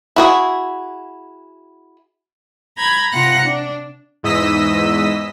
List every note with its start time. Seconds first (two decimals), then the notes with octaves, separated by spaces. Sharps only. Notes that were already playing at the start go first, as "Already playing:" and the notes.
0.16 E4 F#4 G#4
2.76 A#5 B5 G6 G#6
3.12 C3 F4 F#5 A#5 F#6 A#6
3.43 D4
4.23 E2 G#2 D#5 D#6 E6 B6